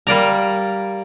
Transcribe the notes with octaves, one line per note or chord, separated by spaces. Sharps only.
G3 A#3 D5 A#5